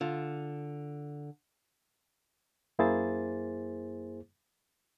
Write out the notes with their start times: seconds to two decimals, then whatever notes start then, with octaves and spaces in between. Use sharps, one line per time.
0.01 D3 F4
2.79 F#2 A#3 E4 G#4 C5 A6